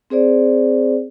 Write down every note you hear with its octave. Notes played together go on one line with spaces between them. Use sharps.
C4 G#4 C5 D5